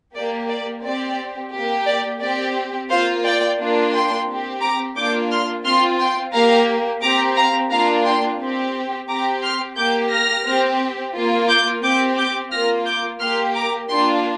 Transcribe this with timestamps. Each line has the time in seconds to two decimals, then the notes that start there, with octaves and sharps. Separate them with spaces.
0.15 A#3 G4 D5
0.50 D5
0.83 C4 G4 D5
1.53 A#3 G4
1.87 D5
2.21 C4 G4 D5
2.90 A#3 F4 C5 F5
3.24 D5 G5
3.59 A#3 D4 F4
3.92 G5 C6
4.28 C4 G4
4.61 A#5 D6
4.96 A#3 D4 F4 D6 G6
5.30 C6 F6
5.65 C4 F4 C6 F6
5.99 G5 C6
6.33 A#3 G4 F5 A#5
7.02 C4 G4 A#5 D6
7.36 F5 A#5
7.71 A#3 D4 F4 F5 A#5
8.05 G5 C6
8.39 C4 G4
9.09 C4 G4 A#5 D6
9.43 C6 F6
9.77 A#3 G4 D6 G6
10.11 F6 A#6
10.46 C4 G4
11.15 A#3 F4
11.49 D6 G6
11.83 C4 G4 D6 G6
12.18 D6 G6
12.52 A#3 F4 F6 A#6
12.86 D6 G6
13.20 A#3 G4 C6 F6
13.55 A#5 D6
13.89 A#3 D4 F4 G5 C6